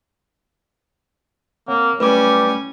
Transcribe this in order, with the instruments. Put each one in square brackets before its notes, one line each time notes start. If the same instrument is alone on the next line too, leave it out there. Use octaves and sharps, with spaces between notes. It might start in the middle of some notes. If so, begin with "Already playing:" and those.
[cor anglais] A#3 [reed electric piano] C4 C#5 F#5
[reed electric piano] F#3 A3 E4 [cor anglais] G3 [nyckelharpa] C#4 G#5 [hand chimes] B4 D6